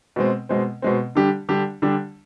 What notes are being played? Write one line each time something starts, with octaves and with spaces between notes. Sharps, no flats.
B2 G#3 C4
B2 G#3 C4
B2 G#3 C4
D3 G3 D4 G4
D3 G3 D4 G4
D3 G3 D4 G4